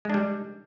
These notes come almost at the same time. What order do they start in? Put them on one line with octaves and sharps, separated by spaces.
G#3 D4 G3